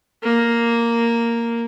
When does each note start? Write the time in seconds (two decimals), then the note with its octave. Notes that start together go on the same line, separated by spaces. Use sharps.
0.23 A#3